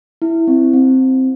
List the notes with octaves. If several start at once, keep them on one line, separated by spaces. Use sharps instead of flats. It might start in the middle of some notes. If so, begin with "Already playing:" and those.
E4
C4
C4